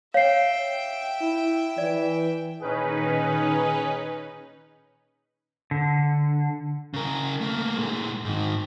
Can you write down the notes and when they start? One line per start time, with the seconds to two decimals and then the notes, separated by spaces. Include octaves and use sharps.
0.14 C#5 E5 F5 G5 C7
1.22 E4
1.78 E3 D5
2.62 A#2 D#3 C#4 D#4 G#4 B4
5.71 D3
6.94 C#3 A#4
7.41 A3 A#3
7.77 A#2 G#3
8.25 G#2 D#3